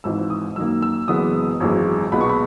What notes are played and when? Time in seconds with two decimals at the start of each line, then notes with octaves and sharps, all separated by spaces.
0.04 G#1 G#2 E3 E6
0.30 D#6
0.56 F#2 D#3 A#3 E6
0.82 E6
1.08 F#1 F#2 E3 G#3 B3 D#6
1.60 G#1 F#2 E3 G#3
2.12 B1 A#2 G#3 B3 B5
2.21 C#6
2.29 B5